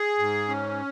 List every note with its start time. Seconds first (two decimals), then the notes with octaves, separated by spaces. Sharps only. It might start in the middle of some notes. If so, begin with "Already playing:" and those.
Already playing: G#4
0.19 G#2
0.49 C#4